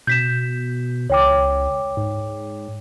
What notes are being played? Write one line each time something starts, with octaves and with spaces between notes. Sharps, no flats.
B2 G6 B6 E7
C#2 C#5 G5 D6
G#2